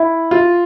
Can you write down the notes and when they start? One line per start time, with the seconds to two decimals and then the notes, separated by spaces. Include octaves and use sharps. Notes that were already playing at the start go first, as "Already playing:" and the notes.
Already playing: E4
0.31 F4